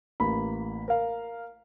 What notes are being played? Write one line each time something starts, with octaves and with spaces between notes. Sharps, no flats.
A1 A#3 B5
A#4 F5